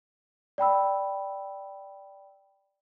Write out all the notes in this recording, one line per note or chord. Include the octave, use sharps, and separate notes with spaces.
D5 G5 B5 E6